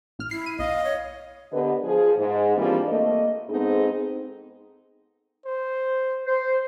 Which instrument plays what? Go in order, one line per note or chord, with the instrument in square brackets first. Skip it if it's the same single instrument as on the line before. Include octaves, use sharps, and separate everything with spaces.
[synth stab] A1 F6
[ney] E4 [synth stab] C7
[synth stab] D#7
[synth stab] B1 [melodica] D#5 [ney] F5
[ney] C#5
[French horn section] D3 B3 G4 A#4 B4 D#5
F3 G#4
G#2
E3 F3 G3 A#3 C4 D4
A3 A#3 D#5
G#2 B3 C4 D#4 G#4 A4
[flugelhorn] C5
[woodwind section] C5